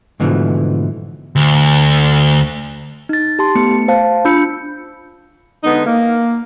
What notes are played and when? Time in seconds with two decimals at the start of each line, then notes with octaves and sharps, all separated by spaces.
0.20 G#2 B2 D3 E3 F3 A3
1.36 D2
3.09 D#4 A6
3.39 G4 A5 C6
3.55 A3 B3 C#7
3.88 C5 F5 A5
4.25 D4 F4 B5 E6 G6 C#7
5.64 D3 G#3 B3 D#4
5.86 A#3